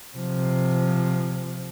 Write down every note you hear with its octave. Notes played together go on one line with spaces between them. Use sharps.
C3 F3